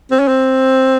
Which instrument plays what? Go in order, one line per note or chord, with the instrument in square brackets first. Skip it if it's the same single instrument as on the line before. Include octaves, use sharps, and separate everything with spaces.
[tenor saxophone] C4
C#4
C4